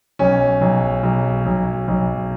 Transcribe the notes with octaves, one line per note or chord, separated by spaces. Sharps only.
B1 C#4
B1
B1
B1
B1